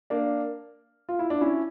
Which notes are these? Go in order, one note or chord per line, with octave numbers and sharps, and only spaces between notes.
A#3 D4
F4
E4
D4
C#4 E4